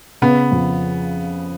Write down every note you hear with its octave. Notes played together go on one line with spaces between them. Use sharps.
C#3 B3
F2